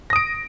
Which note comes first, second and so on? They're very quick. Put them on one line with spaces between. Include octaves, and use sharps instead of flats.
A#6 D#6 D7